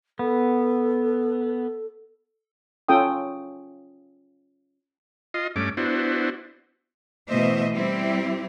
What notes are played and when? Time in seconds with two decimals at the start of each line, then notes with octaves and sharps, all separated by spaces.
0.19 B3 A4
2.89 C#4 F4 A4 G5 D#6
5.34 F4 D#5 C6
5.56 G2 A3 C#4 D6
5.77 B3 D4 E4 F#4 C5
7.27 B2 E3 A3 C5 D#5 E5
7.73 G3 C4 E4 G4